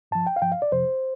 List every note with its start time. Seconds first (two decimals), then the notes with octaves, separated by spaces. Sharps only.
0.11 G2 F3 A5
0.27 G5
0.36 F5
0.42 G2 F3 G5
0.52 F5
0.62 D5
0.72 F2 C3 F3 C5